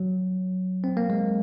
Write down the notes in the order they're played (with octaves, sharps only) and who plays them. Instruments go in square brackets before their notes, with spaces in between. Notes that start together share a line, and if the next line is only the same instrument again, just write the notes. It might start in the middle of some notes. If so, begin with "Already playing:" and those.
Already playing: [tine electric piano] F#3
C4
A#3
G#3